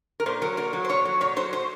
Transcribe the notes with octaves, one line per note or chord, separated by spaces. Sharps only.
A#4
A#2 C5
F#3 A#4
A#2 A#4
F#3
C5
A#2 C#5
F#3
A#2 C#5
F#3 C5
C5